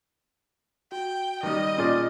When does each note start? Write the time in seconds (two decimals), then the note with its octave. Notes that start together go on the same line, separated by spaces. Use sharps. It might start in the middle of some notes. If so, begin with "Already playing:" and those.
0.92 F#4 G5
1.43 D#3 G3 D#5
1.78 A#2 C#4 F4 G#4 D5 F6